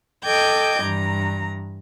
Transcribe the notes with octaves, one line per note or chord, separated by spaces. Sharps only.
A4 D#5 G5 D6 G6 G#6
G2 E3 A#5